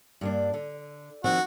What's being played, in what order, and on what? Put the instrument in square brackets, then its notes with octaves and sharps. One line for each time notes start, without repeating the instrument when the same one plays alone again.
[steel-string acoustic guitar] G2 A#3 D4
D3
[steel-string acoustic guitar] D#3 F3 C4 [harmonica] F#4